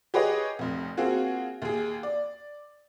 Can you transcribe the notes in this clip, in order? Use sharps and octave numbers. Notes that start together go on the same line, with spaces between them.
G4 G#4 B4 C#5 D#5
F1 F2
A#3 C4 F4 F#4 G#4
D#2 G#4
D5